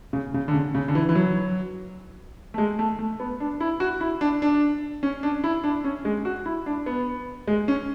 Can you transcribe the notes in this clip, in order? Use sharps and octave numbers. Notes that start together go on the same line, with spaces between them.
C#3
C#3
D3
C#3
C#3
D3
E3
E3
F#3
A3
G#3
A3
A3
B3
D4
E4
F#4
E4
D4
D4
C#4
D4
E4
D4
C#4
G#3
F#4
E4
D4
B3
G#3
C#4